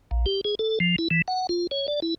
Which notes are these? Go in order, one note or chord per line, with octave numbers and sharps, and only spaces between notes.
A#1
G4
G#4
A4
F3
E4
E3
F#5
F4
C#5
D5
E4